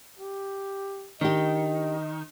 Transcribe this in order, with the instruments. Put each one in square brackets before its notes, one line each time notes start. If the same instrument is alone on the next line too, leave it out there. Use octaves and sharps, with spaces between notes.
[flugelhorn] G4
[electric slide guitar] D#3 [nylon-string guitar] D4 G4 [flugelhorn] D#5